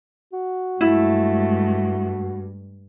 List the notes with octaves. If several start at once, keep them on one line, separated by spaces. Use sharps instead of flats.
F#4
G2 G#3 A3 E4